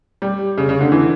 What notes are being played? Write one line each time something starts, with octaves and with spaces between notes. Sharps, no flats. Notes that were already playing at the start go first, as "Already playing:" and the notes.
G3
C#3
C#3
D3
E3